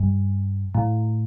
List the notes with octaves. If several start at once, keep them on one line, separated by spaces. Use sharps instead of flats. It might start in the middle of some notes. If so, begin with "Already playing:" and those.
Already playing: G2
A2